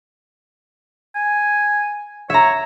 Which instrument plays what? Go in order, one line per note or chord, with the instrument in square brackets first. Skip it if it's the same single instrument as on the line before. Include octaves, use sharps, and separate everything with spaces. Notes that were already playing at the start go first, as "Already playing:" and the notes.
[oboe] G#5
[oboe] C#5 [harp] E5 A#5